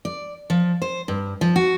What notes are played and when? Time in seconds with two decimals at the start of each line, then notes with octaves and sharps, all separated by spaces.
0.05 D5
0.50 F3
0.82 C5
1.08 G2
1.41 F3
1.56 F#4